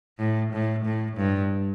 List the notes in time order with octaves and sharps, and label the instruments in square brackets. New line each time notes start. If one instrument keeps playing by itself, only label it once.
[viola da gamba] A2
A2
A2
G2